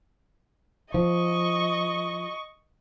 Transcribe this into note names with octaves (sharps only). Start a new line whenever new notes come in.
F3 D#5 C#6